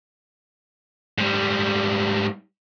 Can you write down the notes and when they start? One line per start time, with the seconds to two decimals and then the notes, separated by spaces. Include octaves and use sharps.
1.18 G#2 G3